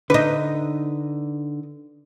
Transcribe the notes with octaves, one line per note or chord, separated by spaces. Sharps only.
D3 D4 D#4 B4